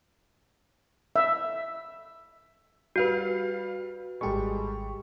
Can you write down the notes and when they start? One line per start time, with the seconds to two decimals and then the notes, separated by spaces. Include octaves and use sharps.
1.16 E5
2.96 G3 F#4 B4 F5
4.21 G#1 G3 G#3 G4 A4 C#6